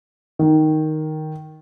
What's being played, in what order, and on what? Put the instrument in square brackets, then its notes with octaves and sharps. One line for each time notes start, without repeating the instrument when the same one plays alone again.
[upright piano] D#3